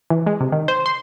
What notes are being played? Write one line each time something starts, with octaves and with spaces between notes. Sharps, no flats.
E3
G#3
C3
D#3
C5
C6